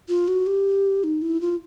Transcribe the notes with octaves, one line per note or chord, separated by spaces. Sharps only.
F4
F#4
G4
D#4
E4
F4